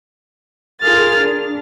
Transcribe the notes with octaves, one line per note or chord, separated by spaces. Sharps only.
F4 G#4 A#4 F6 A6
D4